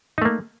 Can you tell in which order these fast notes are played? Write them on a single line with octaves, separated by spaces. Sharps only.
D#4 A3 A#3